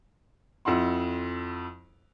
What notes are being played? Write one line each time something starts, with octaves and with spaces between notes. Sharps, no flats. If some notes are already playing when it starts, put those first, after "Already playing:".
F2 E4 F#5 C6